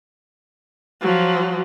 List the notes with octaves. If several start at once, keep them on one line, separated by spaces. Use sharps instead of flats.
F3 F#3